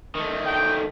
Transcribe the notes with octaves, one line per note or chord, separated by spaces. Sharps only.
D#3 A3
G5